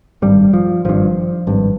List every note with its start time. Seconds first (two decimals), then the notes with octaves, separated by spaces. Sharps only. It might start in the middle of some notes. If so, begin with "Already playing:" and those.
0.22 G#1 G2 G3
0.53 F3
0.85 G#1 G2 F3
1.47 G#1 G2